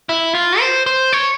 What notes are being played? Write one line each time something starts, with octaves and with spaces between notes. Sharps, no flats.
E4
F4
C5
C5
C#5